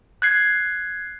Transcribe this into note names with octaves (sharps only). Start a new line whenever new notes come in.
F#6 G#6 C7